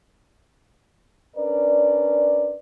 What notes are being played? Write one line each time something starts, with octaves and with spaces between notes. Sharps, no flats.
C#4 D4 A#4 B4 D5